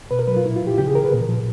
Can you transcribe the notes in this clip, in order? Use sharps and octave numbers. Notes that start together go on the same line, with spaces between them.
B2 B4
A#4
F#3 B4
F4
A#2 E4
F4
F3 G4
C#3 G4
G#4
E3 A#4
B4
A#2
F3